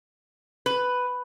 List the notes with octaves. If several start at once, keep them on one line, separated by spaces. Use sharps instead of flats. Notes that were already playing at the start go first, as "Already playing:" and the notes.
B4